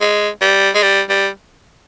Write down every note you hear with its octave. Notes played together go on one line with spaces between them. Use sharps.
G#3
G3
G#3
G3
G3